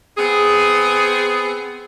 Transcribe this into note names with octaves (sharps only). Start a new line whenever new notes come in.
B3 C4 G#4